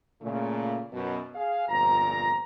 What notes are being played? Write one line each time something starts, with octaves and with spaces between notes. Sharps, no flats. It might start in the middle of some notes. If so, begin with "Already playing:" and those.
A#2 C#3 A3
F#2 B2
G#4 F5
G1 F2 A#2 A#5